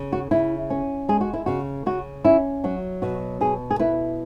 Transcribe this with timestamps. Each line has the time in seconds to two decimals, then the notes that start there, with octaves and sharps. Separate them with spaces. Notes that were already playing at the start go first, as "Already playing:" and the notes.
Already playing: C#3
0.12 F#4
0.31 C#3 E4
0.70 C#4
1.09 G#3 G#4
1.21 F#4
1.34 E4
1.46 C#3 F#4
1.86 C#3 F#4
2.24 C#4 E4
2.64 F#3 F#4
3.02 B2 F#4
3.41 B2 G#4
3.71 G#4
3.79 E4 B4